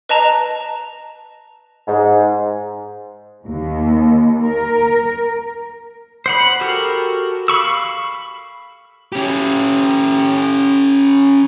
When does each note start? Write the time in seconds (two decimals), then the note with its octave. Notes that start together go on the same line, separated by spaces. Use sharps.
0.09 B4 D#5 A5 A#5
1.88 G#2
3.45 D#2
4.44 A#4
6.26 C5 F#5 B5
6.61 F#4 G4 A4 A#4
7.48 F5 B5 C#6 E6
9.12 C#4 G4